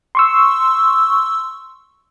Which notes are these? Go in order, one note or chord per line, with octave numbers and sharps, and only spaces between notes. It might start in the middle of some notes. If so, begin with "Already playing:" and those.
C6 C#6 E6